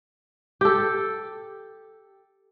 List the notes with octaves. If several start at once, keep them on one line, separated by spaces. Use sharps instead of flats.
G4 A4